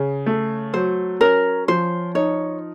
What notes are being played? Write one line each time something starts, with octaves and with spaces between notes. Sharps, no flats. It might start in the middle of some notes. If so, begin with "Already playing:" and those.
Already playing: C#3
A3
F#3 C5
C#4 A#4
F3 C5
D#4 C#5